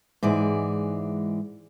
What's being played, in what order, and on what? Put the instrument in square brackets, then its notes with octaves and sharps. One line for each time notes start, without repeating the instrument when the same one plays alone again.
[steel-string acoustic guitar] G#2 E3 G#3 D5